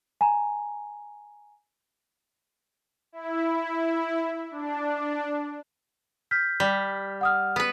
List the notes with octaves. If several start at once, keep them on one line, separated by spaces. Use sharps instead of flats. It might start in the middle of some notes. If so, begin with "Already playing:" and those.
G#5 A#5
E4
D4
F6 G6 B6
G3
F#5 D#6 F6
B3 B4